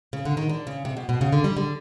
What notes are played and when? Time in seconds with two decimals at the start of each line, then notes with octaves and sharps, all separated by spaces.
0.13 C#3
0.25 D3
0.37 D#3
0.49 D3
0.67 C#3
0.85 C3
0.97 B2
1.09 B2
1.21 C#3
1.33 D3
1.44 G3
1.57 D3